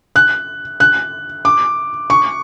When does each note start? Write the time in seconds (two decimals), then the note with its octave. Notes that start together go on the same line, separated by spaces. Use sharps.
0.16 F#6
0.80 F#6
1.45 D6
2.10 C#6